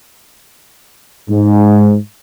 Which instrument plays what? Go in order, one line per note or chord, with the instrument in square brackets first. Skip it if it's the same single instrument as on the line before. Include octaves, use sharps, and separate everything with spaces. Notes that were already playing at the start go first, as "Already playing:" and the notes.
[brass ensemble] G#2